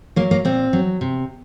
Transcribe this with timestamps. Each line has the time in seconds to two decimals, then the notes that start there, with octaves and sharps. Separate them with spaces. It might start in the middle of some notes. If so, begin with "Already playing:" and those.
0.16 F#3 A#3
0.31 A#3
0.45 A#2 C4
0.73 F#3
1.01 C3